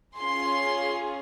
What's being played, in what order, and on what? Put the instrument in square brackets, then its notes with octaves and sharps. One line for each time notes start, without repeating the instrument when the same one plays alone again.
[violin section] C#4 F4 G#4 C6